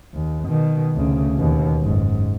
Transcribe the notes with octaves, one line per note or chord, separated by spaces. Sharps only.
D#2
B2 D#3
D2 C#3
D#2 B2
F#1 G#2